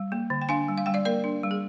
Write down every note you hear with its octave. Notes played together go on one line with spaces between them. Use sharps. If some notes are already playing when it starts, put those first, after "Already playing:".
Already playing: G3
A#3
D3
G5
D4 F5 G#5
G3
F5
G3 G5
D5 F5
A#3 A#4 D5
D4
G3
G#4